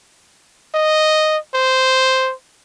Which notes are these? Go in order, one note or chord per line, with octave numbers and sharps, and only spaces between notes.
D#5
C5